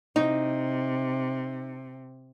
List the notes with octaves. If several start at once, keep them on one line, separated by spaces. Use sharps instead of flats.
C3 D#4